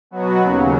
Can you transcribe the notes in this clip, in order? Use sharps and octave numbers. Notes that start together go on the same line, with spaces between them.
B2 F#3 B3 F#4
D#2 C#3 F#3